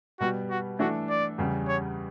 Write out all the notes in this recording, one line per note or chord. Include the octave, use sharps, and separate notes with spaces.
B2 G3 B3 F#4
F#4
E3 A3 D4 F#4 A4
D5
E2 C#3 G3
C#5